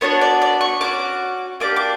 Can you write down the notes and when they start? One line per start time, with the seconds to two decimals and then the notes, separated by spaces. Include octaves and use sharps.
0.01 B3 D4 F#4 C#5
0.21 D5
0.42 D5
0.61 C#6
0.81 C#4 F#4 D6
1.60 A#3 D4 G4 D6
1.76 D6